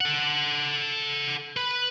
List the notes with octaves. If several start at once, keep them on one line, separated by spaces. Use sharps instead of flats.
A4 F#5
B4 B5